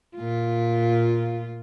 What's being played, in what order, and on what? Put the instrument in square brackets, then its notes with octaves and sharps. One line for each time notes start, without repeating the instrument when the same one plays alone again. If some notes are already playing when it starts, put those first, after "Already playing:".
[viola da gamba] A#2 F4